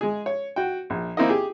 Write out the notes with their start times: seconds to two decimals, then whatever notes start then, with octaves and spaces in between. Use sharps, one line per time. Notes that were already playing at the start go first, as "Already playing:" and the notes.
0.01 G#3 G#4
0.26 C#5
0.56 F#4 G5
0.90 A#1
1.17 A#3 C4 D#4 E4 A#4 D#5
1.29 G4 G#4